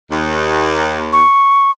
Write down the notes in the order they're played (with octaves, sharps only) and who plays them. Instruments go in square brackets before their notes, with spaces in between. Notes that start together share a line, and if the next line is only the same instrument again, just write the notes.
[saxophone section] D#2
[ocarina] C#6